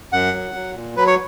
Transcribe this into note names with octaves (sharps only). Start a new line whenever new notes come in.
F#2 F#5
F#3
F#3
A#2
F#3 B4
C#5